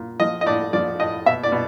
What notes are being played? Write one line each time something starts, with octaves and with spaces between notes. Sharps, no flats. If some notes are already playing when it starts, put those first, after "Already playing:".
Already playing: A#2
F3 D#5
D#5
A2 D5
F3 D5
A2 D#5
B2 E5
D5
B2